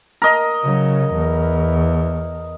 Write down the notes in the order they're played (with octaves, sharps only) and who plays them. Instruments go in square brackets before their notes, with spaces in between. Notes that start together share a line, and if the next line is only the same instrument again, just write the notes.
[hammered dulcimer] A#4 D#5
[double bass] C#3 F#3
E2